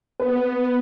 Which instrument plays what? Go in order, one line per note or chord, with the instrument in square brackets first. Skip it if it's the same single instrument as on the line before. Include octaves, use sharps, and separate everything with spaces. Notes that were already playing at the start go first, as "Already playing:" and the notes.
[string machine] B3 [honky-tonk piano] B4